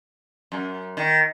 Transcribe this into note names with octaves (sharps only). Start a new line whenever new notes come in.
F#2
D#3